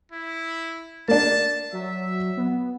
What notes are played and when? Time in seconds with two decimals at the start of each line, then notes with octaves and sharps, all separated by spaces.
0.12 E4
1.08 A#3 D4 A5
1.73 F#3 E5
2.37 B3